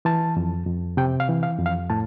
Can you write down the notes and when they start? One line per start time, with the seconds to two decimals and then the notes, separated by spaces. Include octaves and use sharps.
0.05 E3 A5
0.37 F2
0.67 F2
0.97 C3 G5
1.20 F5
1.29 E3
1.43 F5
1.59 F2
1.66 F5
1.90 A2 A5